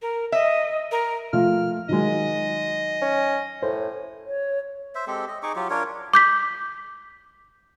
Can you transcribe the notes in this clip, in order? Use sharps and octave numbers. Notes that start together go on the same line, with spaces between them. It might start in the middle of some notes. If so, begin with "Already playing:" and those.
A#4
D#5 E5
A#4
F3 A3 F4 F6
D#3 F#3 G#3 D#5
C#4
A2 C5
C#5
C5 E5
G#3 C4 G4 A4
D#5
D#4 G#4 C#6 D6
F#3 F4 G4
D4 F4 A#4 C#5
D6 G6 B6